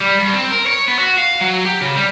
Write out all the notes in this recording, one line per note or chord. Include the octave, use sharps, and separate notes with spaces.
G3
G2
C4
A#4
C#5
B3
F#4
F5
F#3
G4
C#3
G3